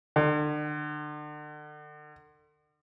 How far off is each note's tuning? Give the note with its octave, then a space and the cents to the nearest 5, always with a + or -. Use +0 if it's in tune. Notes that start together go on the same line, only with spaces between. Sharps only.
D3 +40